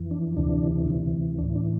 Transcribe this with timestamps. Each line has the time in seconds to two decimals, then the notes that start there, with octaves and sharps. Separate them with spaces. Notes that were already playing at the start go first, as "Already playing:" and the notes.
Already playing: F2 E3
0.11 D4
0.37 D2 C3 E3 D4
0.88 D2 C3 E3
1.38 E3 D4
1.42 A2
1.55 D4